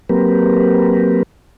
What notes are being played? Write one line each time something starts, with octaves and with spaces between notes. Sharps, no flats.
F#3 A#3 C4 G4 A#4 B4